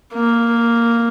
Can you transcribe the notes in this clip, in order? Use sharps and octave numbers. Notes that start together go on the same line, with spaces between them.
A#3